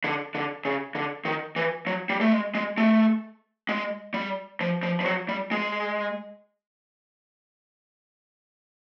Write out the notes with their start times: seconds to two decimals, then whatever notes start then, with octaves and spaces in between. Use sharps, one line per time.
0.04 D3
0.35 D3
0.65 C#3
0.95 D3
1.25 D#3
1.56 E3
1.87 F#3
2.09 G3
2.21 A3
2.32 G#3
2.55 G#3
2.78 A3
3.69 G#3
4.14 G3
4.61 F3
4.83 F3
5.00 F3
5.05 F#3
5.29 G3
5.51 G#3